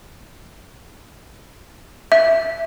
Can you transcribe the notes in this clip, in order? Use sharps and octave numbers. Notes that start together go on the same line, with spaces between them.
E5